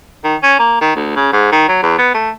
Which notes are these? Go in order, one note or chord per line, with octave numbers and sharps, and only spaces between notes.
D#3
C#4
A#3
D#3
D2
C#3
G#2
D#3
F#3
E2
B3
A3